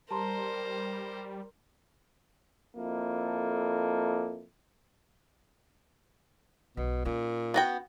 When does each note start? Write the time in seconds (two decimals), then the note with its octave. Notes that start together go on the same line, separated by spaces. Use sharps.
0.11 G3 A#4 C5 A5 A#5 C6
2.76 F2 A#3 E4 A4
6.77 B1 B2
7.05 A#2 C#4 D#4
7.54 B3 F#4 G5